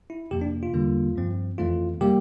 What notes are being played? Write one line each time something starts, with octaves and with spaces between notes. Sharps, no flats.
E4
F2 C3 F3 A#3 G4
D4
F4
E2 D3 G3 A#3
G2 F3 C4
F2 E3 A3 C4 F4
C3 G3 A#3 G4